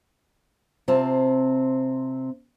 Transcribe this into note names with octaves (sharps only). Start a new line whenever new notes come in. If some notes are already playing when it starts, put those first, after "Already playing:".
C3 C4 F4 A5